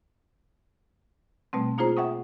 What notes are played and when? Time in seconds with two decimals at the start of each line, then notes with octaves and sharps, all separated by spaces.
1.53 B2 G3 A3 C4
1.78 A#3 D#4 F4 G#4 C5 A#5
1.97 E5 F#5 G5 C#6 D#6